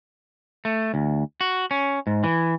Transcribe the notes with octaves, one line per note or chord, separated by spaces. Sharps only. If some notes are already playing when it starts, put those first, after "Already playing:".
A3
D2
F#4
C#4
G#2
E3